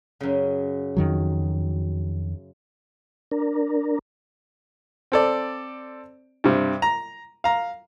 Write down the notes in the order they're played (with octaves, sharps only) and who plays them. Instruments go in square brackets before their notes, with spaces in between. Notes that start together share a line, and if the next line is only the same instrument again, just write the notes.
[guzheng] F#2 C#3
[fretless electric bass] F2 D#3 F#3
[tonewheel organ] D4 A#4
[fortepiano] C4 A4 D5
G2 C3
A#5
F5 A#5